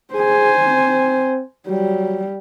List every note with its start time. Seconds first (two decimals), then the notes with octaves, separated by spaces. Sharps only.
0.14 G#4 C5 G#5
0.67 C4
1.68 F#3 G3